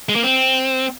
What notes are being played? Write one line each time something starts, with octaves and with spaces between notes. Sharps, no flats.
G#3
A#3
C4